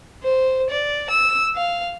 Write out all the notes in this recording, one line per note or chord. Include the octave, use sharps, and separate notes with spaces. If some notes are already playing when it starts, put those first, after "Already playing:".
C5
D5
E6
F5